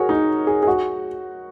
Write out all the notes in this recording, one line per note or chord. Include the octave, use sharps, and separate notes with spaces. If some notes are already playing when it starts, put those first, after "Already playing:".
Already playing: F#4 G#4 A#4 C#5
D#4
G#4
G#4
F#4